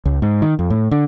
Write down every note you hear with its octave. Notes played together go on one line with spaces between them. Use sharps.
C#2
G#2
D#3
F2
A2
D3